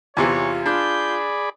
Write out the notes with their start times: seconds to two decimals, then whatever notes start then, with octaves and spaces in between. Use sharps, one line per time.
0.17 E2 C3 E3 F4 C#5
0.66 D4 G#4 D5 B5 G6